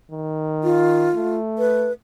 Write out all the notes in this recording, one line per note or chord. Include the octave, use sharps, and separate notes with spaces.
D#3
F4
A3
B4